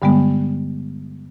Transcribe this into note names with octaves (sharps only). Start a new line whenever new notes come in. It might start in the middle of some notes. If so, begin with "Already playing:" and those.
G2 D3 G3 G#3 B3